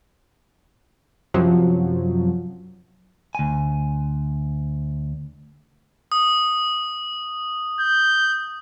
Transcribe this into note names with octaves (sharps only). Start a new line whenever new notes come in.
F#2 C3 F3 F#3
D2 G#5
D#6
G6